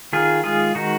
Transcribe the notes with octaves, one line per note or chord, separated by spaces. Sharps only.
D#3 F4 G#4
G#3 F4 G#4
D#3 D#4 F#4